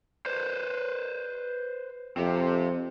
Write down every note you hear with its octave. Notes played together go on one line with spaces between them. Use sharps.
B4 C5
F2 C4 G4